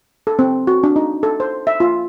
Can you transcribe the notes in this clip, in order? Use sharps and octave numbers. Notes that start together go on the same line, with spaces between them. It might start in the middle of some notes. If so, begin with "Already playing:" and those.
A4
C4
F#4
D4
D#4
A4
C5
E5
F4